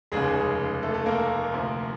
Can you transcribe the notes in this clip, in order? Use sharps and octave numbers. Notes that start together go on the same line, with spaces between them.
F1 D#2 C#3 G#3 G#4
A3 A4
A3 A4
A#3 A#4
D2 C3 F3